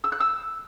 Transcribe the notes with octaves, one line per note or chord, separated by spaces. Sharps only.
E6
F#6
E6